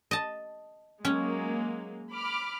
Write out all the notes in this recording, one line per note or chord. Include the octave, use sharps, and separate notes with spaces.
D#5 A5
F#3 G#3 A#3 C#4
B5 D6 F6